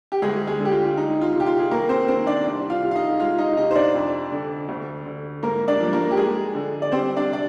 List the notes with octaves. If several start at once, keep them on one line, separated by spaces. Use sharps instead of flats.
G4
D2 G#3 G#4
G#3 G#4
D3
G4
F4
G#3 D#4
F4
C3
G4
F4
G#4
D#2 A#3 A#4
C4 C5
D#3 C4 C5
D4 D5
C2
F4 F5
C3
F5
D#4 D#5
G#3 F4 F5
D#4 D#5
C3 D#4 D#5
C5
D4 D5
F2
D3
D2
D3
G#2 A#3 A#4
D4 D5
F3
A#3 A#4
G4
G#3 G#4
D3
D5
G3 C4 C5
D4 D5
C3 D5